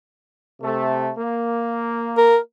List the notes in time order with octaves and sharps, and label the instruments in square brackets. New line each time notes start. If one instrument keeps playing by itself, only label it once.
[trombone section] C3 A3
A#3
[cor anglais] A#4